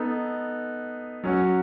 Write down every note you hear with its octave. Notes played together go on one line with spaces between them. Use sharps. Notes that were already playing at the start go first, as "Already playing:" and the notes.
Already playing: B3 D#4 A4
F#3 C#4 F#4